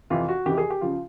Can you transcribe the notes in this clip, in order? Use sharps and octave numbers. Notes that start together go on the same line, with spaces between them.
F2 C3 E3 F4
F#4
F2 C3 E3 G4
G#4
G4
C#3 F3 F4